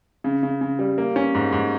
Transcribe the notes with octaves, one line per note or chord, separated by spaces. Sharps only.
C#3
C#3
C#3
G3
A#3
C#4
G#2
G#2